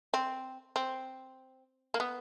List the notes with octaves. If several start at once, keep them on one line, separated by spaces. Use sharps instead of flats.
C4
C4
A#3
B3